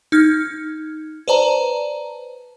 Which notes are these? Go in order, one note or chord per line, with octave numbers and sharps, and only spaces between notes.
D#4 F6 G#6
B4 C5 D5 A5 A#5